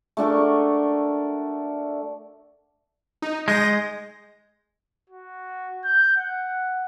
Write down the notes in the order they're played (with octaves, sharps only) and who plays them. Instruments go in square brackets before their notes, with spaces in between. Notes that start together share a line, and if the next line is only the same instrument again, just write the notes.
[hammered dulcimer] A3 D4 F#4 A#4
[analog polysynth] D#4
[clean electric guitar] G#3 [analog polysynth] D#6 G6 A#6
[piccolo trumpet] F#4
G6
F#5